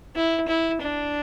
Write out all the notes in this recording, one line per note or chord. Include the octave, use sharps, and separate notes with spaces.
E4
E4
D4